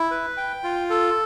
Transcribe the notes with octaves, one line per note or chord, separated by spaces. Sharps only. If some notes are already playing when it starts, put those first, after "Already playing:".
Already playing: E4
B4
G5
F4
A4